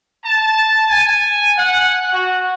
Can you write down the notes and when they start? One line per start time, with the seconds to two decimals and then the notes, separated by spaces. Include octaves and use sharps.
0.23 A5
0.88 G#5
1.57 F#5
2.12 F#4